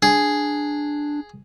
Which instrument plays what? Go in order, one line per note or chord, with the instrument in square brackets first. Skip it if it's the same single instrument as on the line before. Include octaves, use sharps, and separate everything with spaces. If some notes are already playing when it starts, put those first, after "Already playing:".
[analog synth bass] D4 [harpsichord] G#4